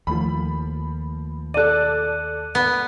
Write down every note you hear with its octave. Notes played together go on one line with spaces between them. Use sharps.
D#2 F3 A3 B5
A4 D5 F#6 D#7
B3